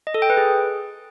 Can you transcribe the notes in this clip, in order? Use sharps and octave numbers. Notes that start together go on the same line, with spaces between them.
D#5
A4
G5
B4
G#4